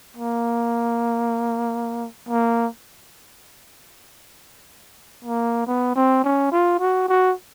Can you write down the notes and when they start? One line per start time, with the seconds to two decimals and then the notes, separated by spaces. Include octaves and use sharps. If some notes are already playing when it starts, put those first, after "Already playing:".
0.17 A#3
2.29 A#3
5.25 A#3
5.67 B3
5.96 C4
6.24 C#4
6.52 F4
6.80 F#4
7.08 F#4